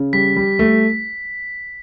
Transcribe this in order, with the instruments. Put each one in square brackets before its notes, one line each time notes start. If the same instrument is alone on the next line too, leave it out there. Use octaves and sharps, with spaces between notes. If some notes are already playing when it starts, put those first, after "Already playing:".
Already playing: [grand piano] C#3
[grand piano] G3 [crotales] B6
[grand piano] G3
A3